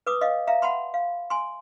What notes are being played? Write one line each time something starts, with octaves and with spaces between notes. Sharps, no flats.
B4 D6 D#6
D#5 F5
E5 F5 A#5
F#5 A5 B5 C6
F5
G#5 C6